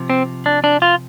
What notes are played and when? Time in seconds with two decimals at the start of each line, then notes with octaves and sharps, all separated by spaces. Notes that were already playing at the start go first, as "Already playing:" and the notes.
Already playing: C3 F3
0.10 C4
0.46 D4
0.64 D4
0.82 F4